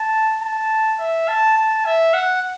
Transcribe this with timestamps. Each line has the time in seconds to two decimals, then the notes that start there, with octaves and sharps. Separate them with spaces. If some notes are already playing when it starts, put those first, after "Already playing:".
Already playing: A5
0.42 A5
1.00 E5
1.28 A5
1.57 A5
1.85 E5
2.14 F#5